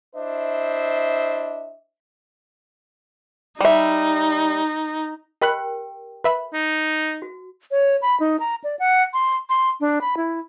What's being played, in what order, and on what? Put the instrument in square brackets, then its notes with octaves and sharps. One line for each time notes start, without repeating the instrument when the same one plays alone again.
[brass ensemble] D4 E4 C5 D#5 E5
[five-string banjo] G3 E5 [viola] D#4
[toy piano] G4 A#4 G5 [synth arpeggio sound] D#5 B5 F#6
[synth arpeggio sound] B4 E5 B5
[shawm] D#4
[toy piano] F#4
[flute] C#5
B5
D#4
A#5
D5
F#5
C6
C6
D4
B5
E4